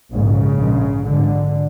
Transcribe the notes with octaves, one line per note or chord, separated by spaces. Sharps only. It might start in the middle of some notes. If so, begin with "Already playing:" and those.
A#1 G#2 C#3
A#1 G#2
G#1 G#2 D3